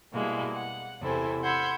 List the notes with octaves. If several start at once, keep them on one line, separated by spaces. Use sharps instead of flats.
B2 G3 G#3 A#3 E4
F#5
E2 C3 E4 A4 C5 G#5
F#5 B5 C6 E6 G6 G#6